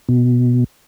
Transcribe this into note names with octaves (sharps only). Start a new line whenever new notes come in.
B2